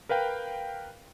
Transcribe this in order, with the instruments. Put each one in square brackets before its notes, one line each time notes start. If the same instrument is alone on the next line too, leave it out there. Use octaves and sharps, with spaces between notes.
[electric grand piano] A#4 B4 F5 G5